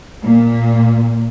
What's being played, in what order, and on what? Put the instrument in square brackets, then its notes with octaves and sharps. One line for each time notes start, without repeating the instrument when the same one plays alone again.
[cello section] A#2